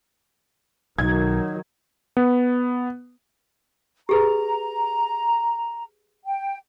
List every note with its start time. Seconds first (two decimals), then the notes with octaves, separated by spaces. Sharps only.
0.98 B1 D#3 F#3 D#4 G#6
2.17 B3
4.09 G4 G#4 B4 A#5
6.25 G5